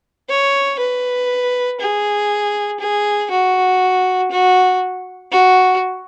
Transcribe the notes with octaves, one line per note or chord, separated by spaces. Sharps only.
C#5
B4
G#4
G#4
F#4
F#4
F#4